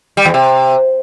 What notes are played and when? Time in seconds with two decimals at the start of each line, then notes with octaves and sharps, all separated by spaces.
0.17 G3
0.26 E2
0.34 C3